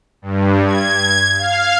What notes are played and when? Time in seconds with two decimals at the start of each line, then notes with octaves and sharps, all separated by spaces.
0.22 G2
0.66 G#6
1.38 F5